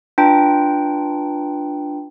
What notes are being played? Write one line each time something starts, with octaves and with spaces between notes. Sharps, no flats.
D4 F4 B4 G5 A#5 D7